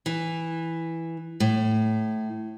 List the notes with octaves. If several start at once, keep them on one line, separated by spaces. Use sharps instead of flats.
E3
A2